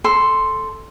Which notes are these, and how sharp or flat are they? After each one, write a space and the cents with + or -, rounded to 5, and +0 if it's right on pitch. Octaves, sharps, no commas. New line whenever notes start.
A4 +0 C6 +0